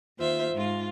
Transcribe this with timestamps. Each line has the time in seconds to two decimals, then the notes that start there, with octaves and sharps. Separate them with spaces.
0.18 D#2 F4 C5 E5
0.53 G#2 F4